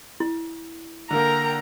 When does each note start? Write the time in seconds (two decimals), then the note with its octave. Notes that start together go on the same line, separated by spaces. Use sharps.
0.20 E4
1.11 D3 A#3 A#4 G5 A#5